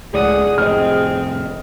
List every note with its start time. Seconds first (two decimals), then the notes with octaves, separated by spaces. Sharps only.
0.14 C#2 A2 G#4 D5 F#5 D#6
0.58 F1 A2 C3 C4 D#5 F6